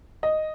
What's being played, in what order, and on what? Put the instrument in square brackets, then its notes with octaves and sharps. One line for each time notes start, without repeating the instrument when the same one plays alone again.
[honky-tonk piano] D#5